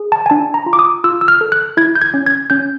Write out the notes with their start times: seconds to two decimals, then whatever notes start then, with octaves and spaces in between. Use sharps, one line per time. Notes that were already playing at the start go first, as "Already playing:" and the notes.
Already playing: G#4
0.12 A5
0.26 G#5
0.30 D4 A5
0.54 A#5
0.66 F4
0.73 D6
0.79 D#6
1.04 F4 E6
1.21 E6
1.28 F6
1.41 A4
1.52 F#6
1.77 E4 G#6
1.95 G6
2.02 G#6
2.14 C#4
2.26 G#6
2.50 C#4 G6